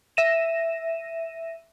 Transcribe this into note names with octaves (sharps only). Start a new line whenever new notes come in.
E5 A#6 D#7 E7